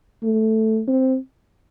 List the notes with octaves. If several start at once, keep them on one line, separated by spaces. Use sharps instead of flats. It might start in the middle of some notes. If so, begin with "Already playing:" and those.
A3
C4